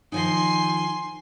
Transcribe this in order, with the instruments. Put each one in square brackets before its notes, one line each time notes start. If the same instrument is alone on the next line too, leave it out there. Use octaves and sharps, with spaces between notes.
[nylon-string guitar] D#3 F3 D#4 [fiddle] G#5 C6